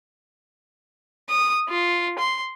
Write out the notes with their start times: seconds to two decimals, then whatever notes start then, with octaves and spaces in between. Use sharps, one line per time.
1.29 D#6
1.69 F4
2.19 C6